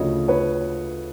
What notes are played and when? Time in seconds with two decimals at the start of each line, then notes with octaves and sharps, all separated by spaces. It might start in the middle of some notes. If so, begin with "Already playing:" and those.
Already playing: D2 C#3 F3 C#5 D#5
0.28 B4 C#5